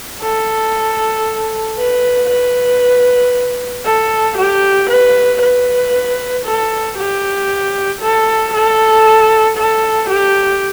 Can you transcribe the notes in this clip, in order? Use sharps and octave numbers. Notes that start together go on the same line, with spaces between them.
A4
B4
B4
A4
G4
B4
B4
A4
G4
A4
A4
A4
G4